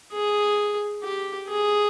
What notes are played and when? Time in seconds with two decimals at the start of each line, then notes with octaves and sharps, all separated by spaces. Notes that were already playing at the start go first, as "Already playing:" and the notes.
0.13 G#4
1.03 G4
1.48 G#4